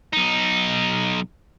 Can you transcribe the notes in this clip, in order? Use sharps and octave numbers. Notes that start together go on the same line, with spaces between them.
B1 D#4